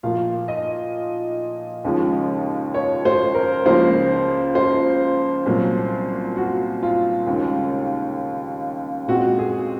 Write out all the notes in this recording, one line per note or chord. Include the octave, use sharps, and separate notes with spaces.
A#2 F3 A#3 F5
D#5
D#2 C#3 F3 G#3
C#5
C5
A#4
C#2 C#3 F3 A#3 C5
C5
C2 A#2 F#3 A#3
F#4
F4
D#2 C#3 G#3
A#2 G#3 C4 F#4
G#4